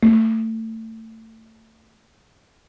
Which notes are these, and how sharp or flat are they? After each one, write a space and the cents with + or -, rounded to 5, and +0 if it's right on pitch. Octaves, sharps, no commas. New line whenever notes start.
A3 +25